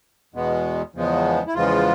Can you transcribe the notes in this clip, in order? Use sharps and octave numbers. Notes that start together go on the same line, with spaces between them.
E2 B2 G#3 B3
E2 C#3 F3 G#3 B3
E4
E2 C#3 F3 G#3 B3 F4